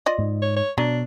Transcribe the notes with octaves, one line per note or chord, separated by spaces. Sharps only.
F4 D5 D#5
G#2
C#5
C#5
B2 F#3 D4